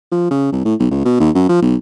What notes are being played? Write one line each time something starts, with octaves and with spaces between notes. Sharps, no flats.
F3
C#3
C2
A2
B1
C#2
B2
D#2
F#2
F3
B1